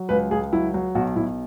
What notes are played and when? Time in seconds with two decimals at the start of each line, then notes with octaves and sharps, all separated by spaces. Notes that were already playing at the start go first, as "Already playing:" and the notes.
Already playing: F#3
0.09 C#2 B4
0.31 C#2 G#4
0.52 F#3 E4
0.74 F#3
0.95 B1 F#4
1.16 B1 E4